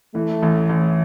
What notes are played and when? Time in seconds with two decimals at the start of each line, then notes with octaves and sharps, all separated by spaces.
0.15 E3 A3
0.43 A1
0.69 A1